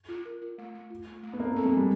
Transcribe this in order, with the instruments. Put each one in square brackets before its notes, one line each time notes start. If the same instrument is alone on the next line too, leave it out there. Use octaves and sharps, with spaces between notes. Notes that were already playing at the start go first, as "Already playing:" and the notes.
[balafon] F4
A#4
F4
A3
A3
F4
A3
A3
[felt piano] B3
[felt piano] A#3 [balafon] C4
[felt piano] A3
[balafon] C4
[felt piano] G#3
[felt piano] G3 [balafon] C4